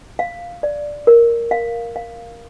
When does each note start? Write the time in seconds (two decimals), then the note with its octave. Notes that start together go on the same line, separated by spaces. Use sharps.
0.19 F5
0.63 D5
1.07 A#4
1.51 F5
1.96 F5